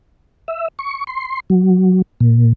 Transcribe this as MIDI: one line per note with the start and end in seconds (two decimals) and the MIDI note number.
0.48 0.68 76
0.79 1.04 85
1.07 1.40 84
1.50 2.02 54
2.20 2.53 46